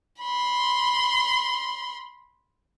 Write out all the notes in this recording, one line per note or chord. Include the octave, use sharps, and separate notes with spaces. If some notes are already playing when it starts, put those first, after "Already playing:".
B5 C6